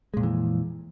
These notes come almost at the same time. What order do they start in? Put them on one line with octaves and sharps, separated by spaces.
G#3 A#2 F2 E3